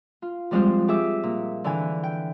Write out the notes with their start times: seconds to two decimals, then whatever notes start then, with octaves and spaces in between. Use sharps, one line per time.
0.22 F4
0.51 F3 G3 G#3 C4 F4 C5
0.88 G4 G#4 E5 D6
1.23 A#2
1.64 D3 E3 G#5
2.03 G5